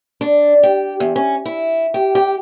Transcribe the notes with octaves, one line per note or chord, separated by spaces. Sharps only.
D4
G4
E2
C#4
E4
G4
G4